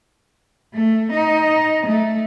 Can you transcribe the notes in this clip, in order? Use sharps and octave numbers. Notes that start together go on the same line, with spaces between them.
A3
D#4
A3